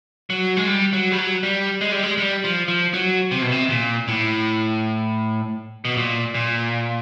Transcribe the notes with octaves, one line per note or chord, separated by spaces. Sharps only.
F#3
G#3
G3
F#3
G3
F#3
G3
G#3
G3
G#3
G3
F3
F3
F#3
C3
B2
C3
A#2
A2
B2
A#2
A#2